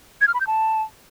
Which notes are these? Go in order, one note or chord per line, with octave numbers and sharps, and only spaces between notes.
G#6
F6
B5
G6
A5